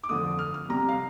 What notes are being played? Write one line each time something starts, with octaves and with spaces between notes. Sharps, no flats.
D6
F2 D3 A3 D#6
F6
F6
C3 G3 A#5
F5